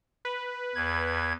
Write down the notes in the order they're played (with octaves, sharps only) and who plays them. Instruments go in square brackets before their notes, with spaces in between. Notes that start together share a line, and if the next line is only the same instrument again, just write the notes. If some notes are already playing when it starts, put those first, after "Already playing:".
[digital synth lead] B4
[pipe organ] E2 G#6